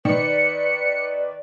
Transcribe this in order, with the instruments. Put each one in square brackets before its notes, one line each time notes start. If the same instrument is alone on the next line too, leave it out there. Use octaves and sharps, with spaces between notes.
[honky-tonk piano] D#3 [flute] B4 [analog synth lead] D5 [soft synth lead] C#7